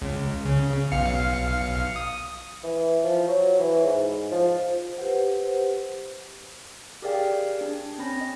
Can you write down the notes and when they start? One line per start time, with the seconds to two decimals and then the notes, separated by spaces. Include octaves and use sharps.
0.02 C#2
0.45 C#3
0.92 B1 F5 C#7
1.96 D#6
2.63 E3
3.04 F3
3.27 F#3
3.59 E3
3.84 G#2
4.31 F3
4.98 G4 B4 C5 F#5
7.02 G4 G#4 A#4 D5 F5 G5
7.61 D4
7.98 C4 C#4 B5 A#6
8.21 D#5